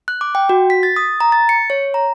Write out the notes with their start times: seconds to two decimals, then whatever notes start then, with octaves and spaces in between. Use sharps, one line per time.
0.08 F#6
0.21 D6
0.35 G5
0.49 F#4
0.70 B6
0.83 A6
0.96 D#6
1.21 A#5
1.32 A6
1.49 C#7
1.70 C#5
1.94 A#5